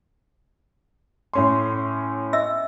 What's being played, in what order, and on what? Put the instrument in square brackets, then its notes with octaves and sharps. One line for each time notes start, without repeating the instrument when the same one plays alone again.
[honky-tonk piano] A2 C#4 C6
[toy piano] D#5 E5 E6